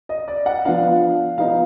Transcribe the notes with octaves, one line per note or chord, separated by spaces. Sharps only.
D#5
D5
F#5
F3 B3 D4 F5
F3 B3 D#4 F5